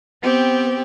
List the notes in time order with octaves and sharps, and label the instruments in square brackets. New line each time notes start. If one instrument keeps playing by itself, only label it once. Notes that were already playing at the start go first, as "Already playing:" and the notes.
[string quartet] B3 C4 G4